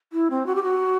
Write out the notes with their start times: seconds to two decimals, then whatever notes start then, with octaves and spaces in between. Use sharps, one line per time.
0.13 E4
0.30 C4
0.46 F#4
0.55 G4
0.63 F#4